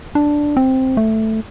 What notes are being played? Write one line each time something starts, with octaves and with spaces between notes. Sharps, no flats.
D4
C4
A3